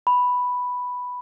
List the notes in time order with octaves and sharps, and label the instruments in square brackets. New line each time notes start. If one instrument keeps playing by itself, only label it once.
[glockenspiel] B5